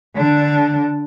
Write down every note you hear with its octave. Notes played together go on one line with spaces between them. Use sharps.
D3 D4